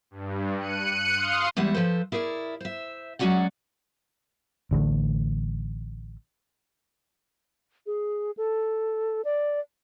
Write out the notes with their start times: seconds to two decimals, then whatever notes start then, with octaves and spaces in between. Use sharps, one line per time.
0.11 G2
0.58 F#6 C#7 D#7
1.16 F5 C6 D#6 F6
1.57 E2 G3 G#3 E4 F#5
1.74 F3 A4 B4 C5
2.12 E4 G#4 A#4 B4 D5
2.60 C5 E5
3.19 F#3 G#3 C#4 F#4 D5 F#5
4.71 A1 D3 F3 A3
7.86 G#4
8.37 A4
9.25 D5